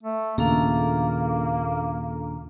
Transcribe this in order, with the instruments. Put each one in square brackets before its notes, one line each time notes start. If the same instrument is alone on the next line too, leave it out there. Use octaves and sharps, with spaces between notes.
[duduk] A3
[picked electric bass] D#2 A#2 C#3 [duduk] A#3 [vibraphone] D4 A4 A#5